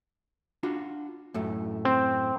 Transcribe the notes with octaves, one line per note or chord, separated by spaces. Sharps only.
D4 F4 F#4
F#2 A2 A3
C4